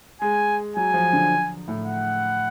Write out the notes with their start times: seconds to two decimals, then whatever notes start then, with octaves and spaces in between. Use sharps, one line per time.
0.21 G#3 G#5
0.76 F#3 G#5
0.94 F3
1.13 D3
1.68 A2
1.86 F#5